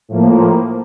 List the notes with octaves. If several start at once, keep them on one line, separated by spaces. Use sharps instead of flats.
A2 F3 A#3